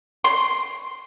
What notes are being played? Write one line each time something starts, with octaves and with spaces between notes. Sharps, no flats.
C6